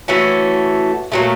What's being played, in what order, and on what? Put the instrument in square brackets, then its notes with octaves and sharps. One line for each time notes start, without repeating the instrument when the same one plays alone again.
[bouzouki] E3 A3 C#4 F#4
A#2 F#3 A3